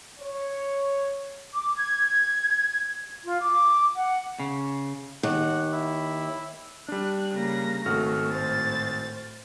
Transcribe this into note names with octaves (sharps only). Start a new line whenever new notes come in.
C#5
D6
G#6
F4
D6
F#5
C#3
D#2 F#5
E4
G3 D4 F#6
C#3 A#3 A#6
G#1 A3 F#4 F6
A2 C5 A6